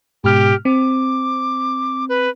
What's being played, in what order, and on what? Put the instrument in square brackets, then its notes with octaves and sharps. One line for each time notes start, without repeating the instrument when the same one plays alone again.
[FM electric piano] G#2 B2 F6 [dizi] G4
[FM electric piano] C4 [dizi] D6
[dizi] B4